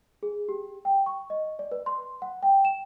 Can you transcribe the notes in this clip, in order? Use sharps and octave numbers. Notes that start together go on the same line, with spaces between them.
G#4
G4
G5
C#6
D#5
D5
B4
C6
F#5
G5
E7